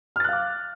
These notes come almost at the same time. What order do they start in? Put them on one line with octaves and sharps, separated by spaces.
F6 A6 F#6 F5 D6